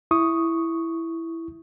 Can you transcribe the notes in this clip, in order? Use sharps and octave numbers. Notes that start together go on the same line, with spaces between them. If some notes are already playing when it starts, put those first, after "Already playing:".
E4 C#6 D#6